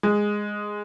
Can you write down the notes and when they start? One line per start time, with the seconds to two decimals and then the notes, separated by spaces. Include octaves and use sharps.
0.03 G#3